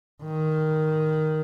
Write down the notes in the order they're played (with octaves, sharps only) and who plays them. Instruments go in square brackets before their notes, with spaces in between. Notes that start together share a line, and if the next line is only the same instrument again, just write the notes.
[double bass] D#3